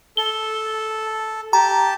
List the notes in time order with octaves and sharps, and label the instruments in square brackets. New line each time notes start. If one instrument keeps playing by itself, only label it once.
[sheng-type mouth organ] A4 [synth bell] G7
[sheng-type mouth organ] G4 A5 [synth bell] A#5